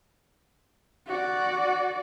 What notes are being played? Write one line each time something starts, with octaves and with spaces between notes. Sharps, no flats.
F#4 D5